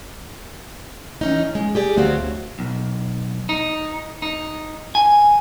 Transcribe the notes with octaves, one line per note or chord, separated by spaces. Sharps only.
E3 C#4 D#4
G#3
G4 G#4 D5
D2 A3 C4 F#4 C#5 F5
B1
D#4
D#4
G#5